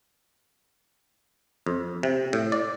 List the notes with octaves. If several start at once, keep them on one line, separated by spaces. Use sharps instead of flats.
F2
C3
A2
D5